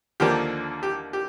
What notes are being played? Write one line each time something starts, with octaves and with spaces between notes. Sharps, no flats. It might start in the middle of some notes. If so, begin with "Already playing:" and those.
D#2 D3 F3 A#3 D4 G4
G4
G4